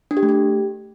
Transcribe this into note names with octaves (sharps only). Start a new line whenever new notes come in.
D4
G4
A3
G4